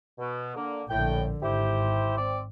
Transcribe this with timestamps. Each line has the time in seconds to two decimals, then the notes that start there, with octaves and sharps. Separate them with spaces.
0.19 B2
0.55 D3 A#3
0.90 A#1 A2 D3 G5
1.42 G#1 E4 G4 C5
2.18 C4 D5